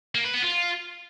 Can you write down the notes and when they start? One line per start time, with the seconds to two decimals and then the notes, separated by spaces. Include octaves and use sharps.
0.15 A#3
0.24 B4
0.34 B3
0.43 F4